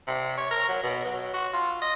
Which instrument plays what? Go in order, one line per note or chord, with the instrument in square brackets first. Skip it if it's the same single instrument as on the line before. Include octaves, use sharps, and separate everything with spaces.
[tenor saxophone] C3
C#5
A#4
F#3
B2
F#3
F#4
F4
D#5